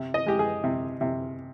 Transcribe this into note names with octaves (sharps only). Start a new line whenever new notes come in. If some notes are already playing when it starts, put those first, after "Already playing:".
Already playing: C3
D#5
G#3 G4
G#4
C3
C3